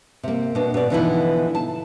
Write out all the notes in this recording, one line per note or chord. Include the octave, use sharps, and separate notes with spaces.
C3 A#3
B2 D4
B2 D5
B2 D3 E3 F3 D#4 E4
A5